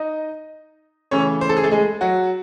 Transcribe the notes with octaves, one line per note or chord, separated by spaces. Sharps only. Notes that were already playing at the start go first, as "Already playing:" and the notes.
Already playing: D#4 D#5
C#3 E3 A3 C#4 C#5
C5
A4
G#4
A3 A4
G#3 G#4
F#3 F#4